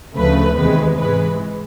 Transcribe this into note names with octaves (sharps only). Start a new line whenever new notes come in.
D2 C#3 F3 A3 B4
E2 C3 D#3 G#3 B4
G#2 E3 G#3 B4